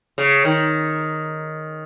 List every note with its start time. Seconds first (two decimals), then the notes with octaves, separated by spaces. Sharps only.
0.18 C#3
0.45 D#3